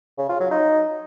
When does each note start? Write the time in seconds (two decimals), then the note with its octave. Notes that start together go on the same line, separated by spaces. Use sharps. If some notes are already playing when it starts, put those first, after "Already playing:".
0.18 C#3
0.29 F4
0.40 F#3
0.51 D#4